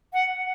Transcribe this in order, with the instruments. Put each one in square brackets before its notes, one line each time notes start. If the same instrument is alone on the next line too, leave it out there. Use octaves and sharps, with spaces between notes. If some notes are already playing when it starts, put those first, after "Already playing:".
[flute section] F#5